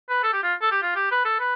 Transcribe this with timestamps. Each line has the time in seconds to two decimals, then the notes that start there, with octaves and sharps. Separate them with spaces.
0.09 B4
0.23 A4
0.33 G4
0.43 F4
0.62 A4
0.71 G4
0.82 F4
0.96 G4
1.11 B4
1.25 A4
1.40 B4